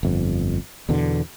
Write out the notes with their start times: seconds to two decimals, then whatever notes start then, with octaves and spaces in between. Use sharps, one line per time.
0.03 G1 F2
0.89 E2 B2 D3